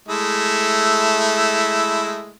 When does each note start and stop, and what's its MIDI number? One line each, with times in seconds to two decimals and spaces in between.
0.09 2.32 56
0.09 2.32 57
0.09 2.32 64